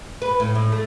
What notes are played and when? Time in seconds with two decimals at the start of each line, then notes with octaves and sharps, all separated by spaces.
0.22 B4
0.40 A2
0.55 A2
0.72 A3